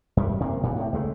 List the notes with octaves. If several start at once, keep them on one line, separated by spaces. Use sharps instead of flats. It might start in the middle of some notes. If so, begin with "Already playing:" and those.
F#2 G3
C3 A#3
E1 G2 A#2
A2 C3
C#2 G#3 A3